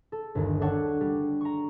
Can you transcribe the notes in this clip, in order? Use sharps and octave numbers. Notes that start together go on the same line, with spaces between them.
A4
G1 D#2
D4 A4 C#5 F#5 C#6
G3
A#5 C#6